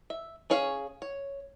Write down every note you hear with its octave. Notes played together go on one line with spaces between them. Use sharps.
E5
C#4 G#4 C#5 F5
C#5